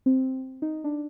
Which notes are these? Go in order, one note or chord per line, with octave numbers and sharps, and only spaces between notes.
C4
D#4
D4